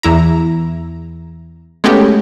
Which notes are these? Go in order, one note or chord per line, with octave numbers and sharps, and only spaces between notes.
E2 E4 A#5
G#3 A3 B3 C#4 F#4 G4